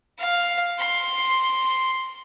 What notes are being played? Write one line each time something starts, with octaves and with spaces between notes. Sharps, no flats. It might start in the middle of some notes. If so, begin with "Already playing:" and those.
F5
C6